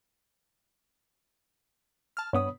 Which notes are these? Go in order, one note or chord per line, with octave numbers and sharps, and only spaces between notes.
A5 F6
G2 B3 C#5 B5 D#6